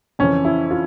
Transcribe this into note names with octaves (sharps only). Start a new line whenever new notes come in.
F2 C#3 E3 C#4
E4
F4